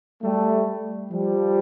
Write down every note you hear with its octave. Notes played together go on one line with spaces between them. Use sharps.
G3 A3
F3 G3